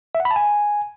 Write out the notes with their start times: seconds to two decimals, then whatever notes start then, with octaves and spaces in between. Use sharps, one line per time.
0.15 E5
0.20 F#5
0.25 B5
0.31 A5
0.36 G#5